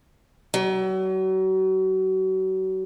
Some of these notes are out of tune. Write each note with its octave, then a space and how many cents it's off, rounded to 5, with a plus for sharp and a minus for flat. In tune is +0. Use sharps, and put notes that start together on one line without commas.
F#3 +35